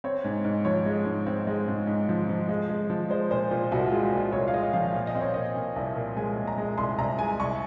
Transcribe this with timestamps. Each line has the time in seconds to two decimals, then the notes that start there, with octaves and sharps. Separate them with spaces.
0.04 C4 C#5
0.24 G#2
0.45 G#2
0.65 F3 C#5
0.86 G#3
1.06 G#2
1.27 C4
1.47 G#3
1.68 G#2
1.87 G#2
2.09 F3
2.29 F3
2.49 G#3
2.70 G#3
2.90 F3
3.10 G#3 C5
3.31 A#2 C5
3.51 A#2 F4
3.72 C2 F#4
3.88 G#3 F4
4.13 A#2 F4
4.32 C2 C#5
4.48 F5
4.54 G#3 D#5
4.73 F3 F5
4.94 A#2 F5
5.07 D#5
5.15 C4
5.21 C#5
5.34 A#2 D#5
5.56 A#2
5.76 C2
5.96 A#2
6.17 G#3 G#5
6.37 A#2
6.47 A#5
6.58 G#3
6.78 C2 C6
6.98 C2 A#5
7.19 G#3 G#5
7.40 C2 C#6